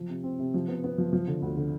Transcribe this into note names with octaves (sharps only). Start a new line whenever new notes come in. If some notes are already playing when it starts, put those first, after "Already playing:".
Already playing: F3
C3
C4
C3
F3
B3
B3
F3
F3
D3
D2
D3